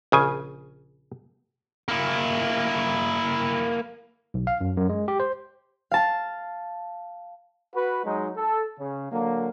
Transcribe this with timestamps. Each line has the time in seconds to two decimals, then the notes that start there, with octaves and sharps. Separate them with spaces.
0.12 A#1 C#3 G#5
1.88 A#3 E4
4.34 B1
4.47 F5
4.61 F#2
4.77 F#2
4.89 G#3
5.08 G4
5.20 C5
5.91 F5 A5
7.75 F#4 B4
8.05 F#3 G#3 D#4
8.37 A4
8.80 C#3
9.11 D3 F#3 A#3